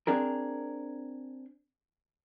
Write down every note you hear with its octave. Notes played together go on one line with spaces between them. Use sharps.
C4 D4 G#4 A#4